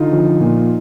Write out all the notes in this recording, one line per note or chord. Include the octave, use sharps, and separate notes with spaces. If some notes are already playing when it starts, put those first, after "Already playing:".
Already playing: D3 D#4 F4
F3
A#2